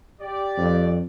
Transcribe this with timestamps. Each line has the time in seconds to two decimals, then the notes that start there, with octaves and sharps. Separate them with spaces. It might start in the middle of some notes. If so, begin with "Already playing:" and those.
0.21 G4 D5
0.58 F2